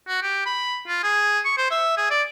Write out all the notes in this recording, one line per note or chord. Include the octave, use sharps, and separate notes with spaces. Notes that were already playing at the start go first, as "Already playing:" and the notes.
F#4
G4
B5
F4
G#4
C#6
C5
E5
G#4
D5